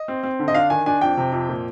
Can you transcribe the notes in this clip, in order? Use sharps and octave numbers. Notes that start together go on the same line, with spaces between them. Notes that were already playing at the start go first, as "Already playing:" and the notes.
Already playing: D#5
C4
C4
D3
D#5
D4 F5
D#3 G#5
D4 G#5
F2 G5
C3
F2
A#2